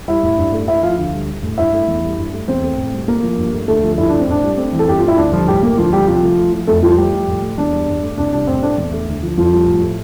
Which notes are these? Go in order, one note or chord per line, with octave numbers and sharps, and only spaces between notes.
G3 E4 E5
A2
G2
A3
A3 E4 E5
F3 F4 F5
D2
G3
G3
A2
G2 E4 E5
A3
E2
G3
G2
A3
E2 C4 C5
A3
A2
G3
A3 A#3 A#4
F3
G2
A3
D2 A3 A4
F3
G2 E4
A3 D4
C4
A2 D4
G3
A3 C4
E3
A4
G2 G4
A3 F4
E4
D2 D4
F3 G3 F4
A2 G3 G4
A3 A#3 A#4
D2 F3 F4
G3 G4
C2 F3 F4
A3
A3
F3
F2 A3 A4
F3 G3 F4
G3 A3 G4
F3
A2
A3
E2 D4
G3
G2
A3
C2 D4
G3 D4
A2 C4
A3 D4
E2
A3
D2
F3
F2 F3 F4
G3
A2
A3